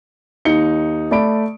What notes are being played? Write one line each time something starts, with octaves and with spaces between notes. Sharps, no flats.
D#2 D#4 C#7 G7
A3 D5 B5 D7